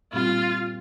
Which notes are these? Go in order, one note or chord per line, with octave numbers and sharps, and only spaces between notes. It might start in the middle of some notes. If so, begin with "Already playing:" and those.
A#2 G3 C4 F4